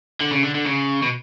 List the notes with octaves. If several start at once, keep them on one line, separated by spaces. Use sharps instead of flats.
D3
C#3
D3
D3
C#3
B2